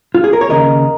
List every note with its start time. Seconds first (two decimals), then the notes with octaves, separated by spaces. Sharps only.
0.15 F4
0.24 G#4
0.33 A#4
0.41 C#5
0.49 D#2 C#3 A#3 A#4 D#5